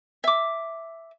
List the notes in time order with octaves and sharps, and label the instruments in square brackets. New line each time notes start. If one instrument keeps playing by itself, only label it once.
[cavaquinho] E5 D6